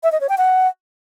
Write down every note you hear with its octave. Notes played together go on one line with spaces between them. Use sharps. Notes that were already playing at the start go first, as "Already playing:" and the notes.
E5
D#5
C#5
G5
F#5